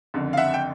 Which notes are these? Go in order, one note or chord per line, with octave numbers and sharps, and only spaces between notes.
F#1 F2 D3
F5
E5 F#5
G5